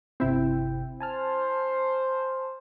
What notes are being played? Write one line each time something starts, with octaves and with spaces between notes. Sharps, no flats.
G1 C3 C4 E4 G5
C5 G#5 A5 F6